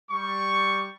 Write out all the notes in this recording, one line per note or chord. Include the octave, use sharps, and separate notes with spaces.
G3 C#6